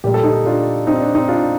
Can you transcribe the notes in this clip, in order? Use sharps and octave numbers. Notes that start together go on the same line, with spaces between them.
A#2 G3 G4
A4
D#4 G4
D4 F4
C4 D#4
D4
C4 D#4
D4 F4